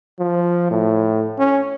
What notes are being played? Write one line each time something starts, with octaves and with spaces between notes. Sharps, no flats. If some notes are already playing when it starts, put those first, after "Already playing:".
F3
A2
C#4